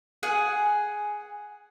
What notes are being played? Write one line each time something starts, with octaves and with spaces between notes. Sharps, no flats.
G#4 F#5 G#5